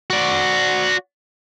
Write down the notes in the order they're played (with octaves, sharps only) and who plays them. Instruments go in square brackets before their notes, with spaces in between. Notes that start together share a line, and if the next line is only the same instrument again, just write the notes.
[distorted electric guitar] F#4 D5